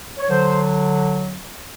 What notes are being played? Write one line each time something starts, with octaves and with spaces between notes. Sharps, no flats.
C#5
D3 F#3 C5